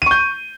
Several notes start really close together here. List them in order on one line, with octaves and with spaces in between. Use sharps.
D#7 C#6 G6